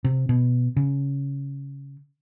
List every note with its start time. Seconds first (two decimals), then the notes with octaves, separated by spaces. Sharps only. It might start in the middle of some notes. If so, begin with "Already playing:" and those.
0.04 C3
0.29 B2
0.76 C#3